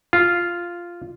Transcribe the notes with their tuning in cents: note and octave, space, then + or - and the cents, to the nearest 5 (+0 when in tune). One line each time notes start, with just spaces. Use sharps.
F4 -5